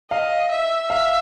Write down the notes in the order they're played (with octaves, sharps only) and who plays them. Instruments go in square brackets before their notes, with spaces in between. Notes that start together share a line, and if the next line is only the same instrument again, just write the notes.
[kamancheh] D#5 [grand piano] F5
[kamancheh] E5
[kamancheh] E5 [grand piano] F5